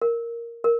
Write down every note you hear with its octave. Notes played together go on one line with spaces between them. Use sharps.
A#4
A#4